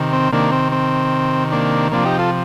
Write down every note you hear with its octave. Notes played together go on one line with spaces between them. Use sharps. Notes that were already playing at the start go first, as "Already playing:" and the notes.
Already playing: C3 D#3
C4
C3 D#3 A#3 D4
C4
C4
A#3 D4
C3 F3 A#3 D4
D#4 G4
F4 A4